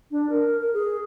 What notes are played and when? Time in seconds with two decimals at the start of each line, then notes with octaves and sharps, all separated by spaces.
0.11 D4
0.29 A#4
0.60 A#4
0.74 G#4